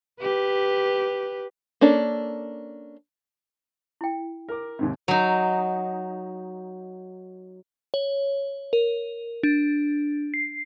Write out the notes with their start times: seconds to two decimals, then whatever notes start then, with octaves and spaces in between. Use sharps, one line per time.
0.21 G4 B4
1.81 A#3 C#4 D4 A4
4.01 E4 G5
4.49 A#4 D6
4.79 D#2 G#2 C3
5.08 F#3 D#4
7.94 C#5
8.73 A#4
9.43 D4
10.34 C7